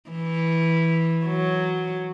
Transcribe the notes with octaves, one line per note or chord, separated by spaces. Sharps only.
E3
F#3